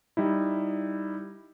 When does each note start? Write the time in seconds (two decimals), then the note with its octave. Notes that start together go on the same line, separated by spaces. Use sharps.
0.17 G3 D#4 E4